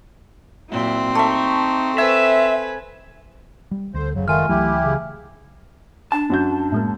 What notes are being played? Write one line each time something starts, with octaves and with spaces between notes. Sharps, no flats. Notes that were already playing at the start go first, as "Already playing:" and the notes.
A#2 F#3 C4 E4
A3 D#4 E5
A4 B4 C5 E5 G#5
G3
D2 D3 C5
F#1 C#3 F#3
D#3 G#3 A3 F4 G#5 F6
C#2 E3 F#3 A3 E4 G4
C#3
D4 A5
F#2 F#4 G6
A2 G#3 A#3